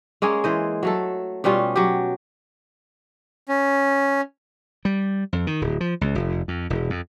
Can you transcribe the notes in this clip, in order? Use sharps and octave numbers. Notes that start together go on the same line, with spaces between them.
G#3 A#3 C#4 G#4
E3 C5 D#5
F#3 A3 A4
B2 G3 C#4 F4
F#3 G4
C#4
G3
F2
D#3
D1
F3
C#2
F1
F2
E1
F2